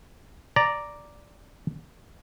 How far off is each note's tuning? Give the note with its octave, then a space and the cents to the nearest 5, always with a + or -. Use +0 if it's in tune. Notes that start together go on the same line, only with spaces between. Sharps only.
D5 +0 A#5 +0